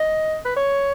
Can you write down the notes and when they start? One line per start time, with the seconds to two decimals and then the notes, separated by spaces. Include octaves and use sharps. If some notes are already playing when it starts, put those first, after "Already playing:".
Already playing: D#5
0.45 B4
0.57 C#5